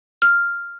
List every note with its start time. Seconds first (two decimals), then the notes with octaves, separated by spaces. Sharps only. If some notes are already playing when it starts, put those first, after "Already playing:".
0.22 F6